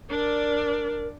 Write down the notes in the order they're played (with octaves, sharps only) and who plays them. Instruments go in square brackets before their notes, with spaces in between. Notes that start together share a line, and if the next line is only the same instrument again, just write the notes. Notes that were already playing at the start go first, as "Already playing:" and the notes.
[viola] D4 D5 [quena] A#4